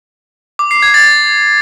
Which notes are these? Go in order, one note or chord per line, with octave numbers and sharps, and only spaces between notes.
D6
C7
G#6
A6